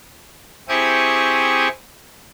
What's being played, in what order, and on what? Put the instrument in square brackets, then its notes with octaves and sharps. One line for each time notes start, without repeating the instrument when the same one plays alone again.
[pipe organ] C4 E4 G4 G#4 C#6 D#6